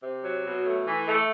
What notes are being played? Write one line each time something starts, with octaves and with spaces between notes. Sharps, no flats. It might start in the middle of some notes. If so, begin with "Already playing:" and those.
C3
F#3
B2
A3
E3
A3